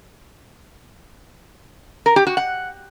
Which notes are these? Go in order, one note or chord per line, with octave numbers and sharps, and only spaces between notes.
A#4
G4
F#4
F#5